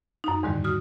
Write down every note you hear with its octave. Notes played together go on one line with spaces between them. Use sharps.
F#2 D#4
E2 G#2 D3 D#3 G3
F#4 D#6 F6